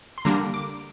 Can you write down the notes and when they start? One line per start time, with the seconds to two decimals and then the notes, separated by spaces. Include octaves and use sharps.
0.18 C6
0.25 D3 G3 A#3 D4 A#5
0.54 D6